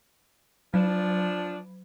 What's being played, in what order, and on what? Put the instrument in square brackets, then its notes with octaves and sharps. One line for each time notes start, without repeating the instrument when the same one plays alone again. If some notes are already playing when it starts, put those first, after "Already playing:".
[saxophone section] F3 D4 [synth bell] F#3